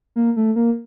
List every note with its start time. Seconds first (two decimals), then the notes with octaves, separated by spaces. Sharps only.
0.16 A#3
0.36 A3
0.56 A#3